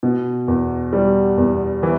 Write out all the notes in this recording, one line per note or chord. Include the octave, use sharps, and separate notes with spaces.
B2
E2
G3
E2
E3